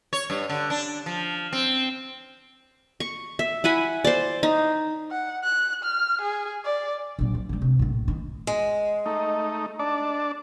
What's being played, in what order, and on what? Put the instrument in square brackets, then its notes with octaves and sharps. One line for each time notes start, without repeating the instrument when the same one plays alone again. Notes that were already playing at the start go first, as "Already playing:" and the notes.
[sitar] C#5
G2
D3
D4
F3
C4
[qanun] C#6
E5
E4 F#5 G#5 B5
C5 D5
D#4
[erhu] F#5
F#6
F6
G#4
D5
[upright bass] A#1 F#3
F3
D3 G#3
C3
A#1 A2
D#3
[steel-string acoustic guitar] G#3
[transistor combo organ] A3 D#4
D4 D5 A5